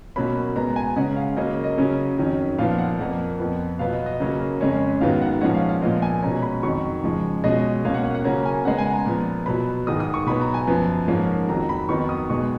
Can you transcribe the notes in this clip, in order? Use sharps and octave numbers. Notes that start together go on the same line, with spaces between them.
B2 F#3 A#3 C#4 B5
B2 G#3 B3 A#5
G#5
C#3 G#3 C#4 F#5
F5
C#3 F#3 A#3 C#4 D#5
D#5
C#3 F#3 C#4
F2 D#3 F#3 C#4
A#2 F3 B3 F5
F#5
F2 F3 A#3
F2 F3 B3
B2 F#3 B3 F5
D#5
D#5
C#3 F#3 A#3 C#4
F2 C#3 G#3 C#4
G#2 D#3 F#3 B3 F5
F#5
A#2 F3 G#3 C#4 F#5
F5
F5
A#2 F3 B3 D#5
G#5
B2 G#3 C#4 A#5
B5
F2 D#3 F#3 C#6
C#3 F3 G#3
B2 G#3 C#4 D#5
B2 A#3 C#4 F5
F#5
F#5
F#5
C#3 F#3 A#3 C#4 A#5
G#5
C#3 G#3 B3 F#5
G#5
A#5
A#2 F3 B3
B2 F#3 B3 B5
G#2 D#3 G#3 D#6
D#6
C#6
B2 F#3 B3 B5
A#5
G#5
F#2 F3 B3
G#2 F3 A#3 C#4
F2 D#3 F#3 A#5
B5
F2 D#3 F#3 B3 C#6
D#6
B2 G#3 B3 C#6